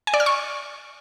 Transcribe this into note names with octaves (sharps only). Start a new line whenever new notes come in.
G#5
D5
F6
C#6